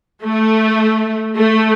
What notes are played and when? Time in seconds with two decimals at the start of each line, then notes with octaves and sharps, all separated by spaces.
0.24 A3
1.37 A3